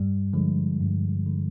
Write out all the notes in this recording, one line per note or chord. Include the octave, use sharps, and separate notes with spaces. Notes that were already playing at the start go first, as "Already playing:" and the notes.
Already playing: G2 G3
D3 F3 G#3
G2
D3